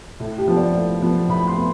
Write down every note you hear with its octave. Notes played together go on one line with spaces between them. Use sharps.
A2
G4
F3 B3
D5
A2
F3 B3
A2 B5
C6
B3